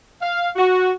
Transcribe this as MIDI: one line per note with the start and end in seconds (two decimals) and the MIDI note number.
0.21 0.48 77
0.56 0.91 66